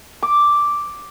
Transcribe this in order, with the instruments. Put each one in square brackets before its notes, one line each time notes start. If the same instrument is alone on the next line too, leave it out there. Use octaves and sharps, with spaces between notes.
[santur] D6